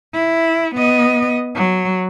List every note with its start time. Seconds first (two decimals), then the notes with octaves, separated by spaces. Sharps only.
0.14 E4
0.75 B3 D#5
1.55 F#3